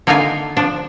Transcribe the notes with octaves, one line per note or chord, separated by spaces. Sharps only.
D3 A#3 D#4 F4 F5 G#5
F3 D4